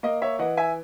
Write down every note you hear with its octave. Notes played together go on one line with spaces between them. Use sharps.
A#3 D#5
C#5 E5
E3 D#5 F#5
E5 G#5